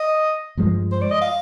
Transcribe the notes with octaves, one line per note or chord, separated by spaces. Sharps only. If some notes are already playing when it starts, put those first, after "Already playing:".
Already playing: D#5
G2 F3 G#3
C5
D5
D#5
F5